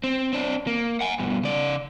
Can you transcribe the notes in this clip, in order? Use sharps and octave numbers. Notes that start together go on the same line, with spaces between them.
C4
C4 D4
A#3
F#5 G#5
G2 B2
C#3 D5